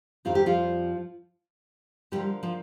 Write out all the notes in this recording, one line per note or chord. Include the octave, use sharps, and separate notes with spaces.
F2 D#3 G3 C4 F4
G4
F3 F4
D3 F3 G3 A#3 G4
F3 F4